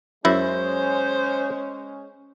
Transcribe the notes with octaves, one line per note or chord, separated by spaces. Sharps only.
F#2 G#3 C#4 E4 C5